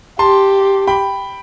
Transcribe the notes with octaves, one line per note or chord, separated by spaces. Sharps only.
G4 A5 C6
G5 B5